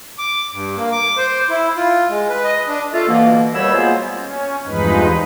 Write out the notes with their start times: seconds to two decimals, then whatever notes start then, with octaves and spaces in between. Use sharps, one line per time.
0.18 D6
0.53 G2
0.76 A#3
0.92 D6
1.17 C5
1.50 E4
1.77 F4
2.09 G#3
2.29 B4
2.44 D#5
2.68 D4
2.93 A3 F4 A4
3.08 B2 D3 E3 A#3
3.53 D#2 B2 G3 C#5 B5 E6
3.73 F#3 G#3 A#3 B3 F4 C5
4.16 C#4
4.66 E2 G2 F3 G#3 D#4 B4